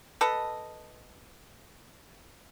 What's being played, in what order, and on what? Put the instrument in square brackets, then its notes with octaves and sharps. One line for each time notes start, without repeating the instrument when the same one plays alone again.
[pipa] A4 B4 D#5